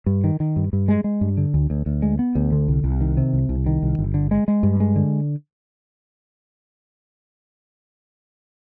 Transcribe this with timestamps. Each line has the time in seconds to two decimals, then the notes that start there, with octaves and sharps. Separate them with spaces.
0.06 G2
0.24 D#3
0.40 D#3
0.56 G2
0.73 G2
0.88 G#3
1.04 G#3
1.21 G2
1.37 D3
1.54 D2
1.70 D2
1.86 D2
2.02 G#3
2.19 B3
2.35 D2
2.52 D3
2.68 C2
2.84 C2
3.01 D#3
3.17 C3
3.33 C2
3.49 C2
3.66 D#3
3.83 C2
3.99 G1
4.14 D3
4.31 G#3
4.48 G#3
4.63 G2
4.80 G#3
4.96 D3